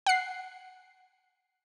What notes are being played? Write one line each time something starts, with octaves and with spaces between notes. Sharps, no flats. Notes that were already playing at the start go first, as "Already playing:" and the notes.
F#5 C7